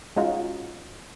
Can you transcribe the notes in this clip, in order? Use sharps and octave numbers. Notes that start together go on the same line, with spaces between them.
G#3 C#4 D#4 F4 F#4